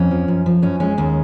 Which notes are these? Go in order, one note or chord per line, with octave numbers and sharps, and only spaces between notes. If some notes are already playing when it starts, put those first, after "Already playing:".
Already playing: F2 C#4
F3
F#2
F3
F#2 C#4
G#3 C#4
D#2 C#4